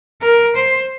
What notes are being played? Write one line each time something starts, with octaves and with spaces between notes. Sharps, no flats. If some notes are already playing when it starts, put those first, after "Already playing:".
A#4
C5